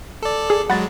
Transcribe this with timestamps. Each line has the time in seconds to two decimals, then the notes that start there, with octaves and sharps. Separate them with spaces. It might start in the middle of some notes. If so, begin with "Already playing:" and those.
0.23 A4 D5
0.50 G#4
0.70 F#3 G#3 F#5 B5 A6